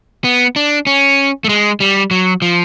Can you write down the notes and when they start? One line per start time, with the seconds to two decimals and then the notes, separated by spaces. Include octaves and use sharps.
0.24 B3
0.56 D4
0.87 C#4
1.44 A3
1.49 G#3
1.80 G3
2.11 F#3
2.42 F3